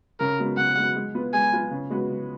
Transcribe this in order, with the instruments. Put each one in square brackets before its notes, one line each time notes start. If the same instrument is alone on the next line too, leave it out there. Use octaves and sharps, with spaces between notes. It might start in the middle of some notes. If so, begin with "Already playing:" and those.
[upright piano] C#3 [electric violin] A#4
[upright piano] G#3 B3 F#4
[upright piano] C#3 [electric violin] F#5
[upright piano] G#3 B3 F#4
G#3
B3 F4 B4
[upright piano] G#3 [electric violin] G#5
[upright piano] B3 F4 B4
C#3
G#3 B3 F#4 B4
C#3